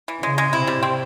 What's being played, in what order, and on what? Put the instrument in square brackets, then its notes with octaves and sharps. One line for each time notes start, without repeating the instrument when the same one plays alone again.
[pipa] E3
[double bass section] C#3 [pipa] G#3
[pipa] G#3
[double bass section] C3 [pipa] E4
[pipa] G3
C4